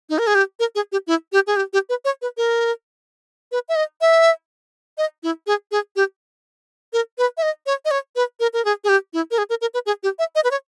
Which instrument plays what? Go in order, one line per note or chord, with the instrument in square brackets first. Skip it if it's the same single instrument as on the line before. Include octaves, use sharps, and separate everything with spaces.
[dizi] D#4
A#4
G#4
G4
A#4
G#4
G4
E4
G4
G#4
G4
G4
B4
C#5
B4
A#4
B4
E5
D#5
E5
D#5
E4
G#4
G#4
G4
A#4
B4
E5
D#5
C#5
D#5
C#5
B4
A#4
A#4
G#4
G#4
G4
E4
A#4
G#4
A#4
A#4
B4
G#4
G4
E5
D#5
B4
C#5